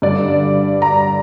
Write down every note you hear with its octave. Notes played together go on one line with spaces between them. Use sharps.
G2 D3 D5
A#5